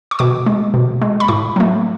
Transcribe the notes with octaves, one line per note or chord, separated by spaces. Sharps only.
C#6
B2 D6
G#3
B2
G#3
B5
A2 C#6
F#3 A3